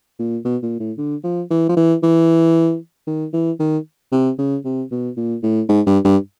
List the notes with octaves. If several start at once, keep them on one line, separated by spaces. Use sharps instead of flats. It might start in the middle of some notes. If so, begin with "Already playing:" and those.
A#2
B2
A#2
A2
D3
F3
E3
F3
E3
E3
D#3
E3
D#3
C3
C#3
C3
B2
A#2
A2
G#2
G2
G2